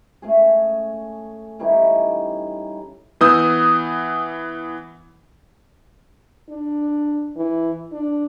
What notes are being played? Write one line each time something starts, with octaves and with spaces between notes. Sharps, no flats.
A3 C#4 G#4
E3 G3 C#4 D#4
E3 B3 D#6 E6 G6
D4
E3
D4